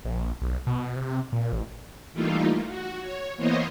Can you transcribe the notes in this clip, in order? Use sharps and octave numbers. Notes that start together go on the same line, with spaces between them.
A#1
B1
B2
C3
A#2
A1
E3 G3 A3 A#3 D#4 F4
F#4
C#5
E3 A#3 B3 C5 C#5 D#5